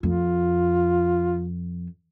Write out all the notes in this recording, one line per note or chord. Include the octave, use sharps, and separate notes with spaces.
F2 F4